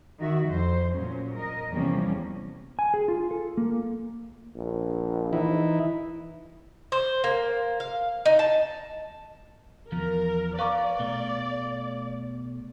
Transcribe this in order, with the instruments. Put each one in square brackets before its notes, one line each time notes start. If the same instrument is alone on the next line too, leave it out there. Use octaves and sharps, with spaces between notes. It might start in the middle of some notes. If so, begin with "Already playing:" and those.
[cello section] D#3 F#4 E5
F2 C5
A#2 F#3 C#4
A#4 D#5
E2 C3 F3 G3 A#3 C#4
[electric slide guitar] G#5
G#4
F4
A4
A#3
[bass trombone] A#1
[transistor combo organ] E3 D#4 E4
[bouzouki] C5
A#3
F5
D#4
A5
[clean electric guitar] E2 F3 [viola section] A#4
[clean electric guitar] B4 A#5 [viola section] D5 [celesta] F5 C#6 D6
[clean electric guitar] B2 A3